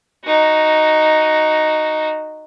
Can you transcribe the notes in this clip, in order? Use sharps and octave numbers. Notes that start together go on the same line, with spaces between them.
D#4 F#4